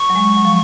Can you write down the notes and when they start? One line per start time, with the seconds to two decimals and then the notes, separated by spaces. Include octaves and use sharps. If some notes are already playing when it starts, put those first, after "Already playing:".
Already playing: C#6
0.10 F#3
0.15 G#3
0.37 F#3
0.45 F3